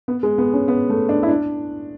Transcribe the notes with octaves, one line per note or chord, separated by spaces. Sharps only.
B3
G#3
B3
C#4
B3
A3
D4
E4
D4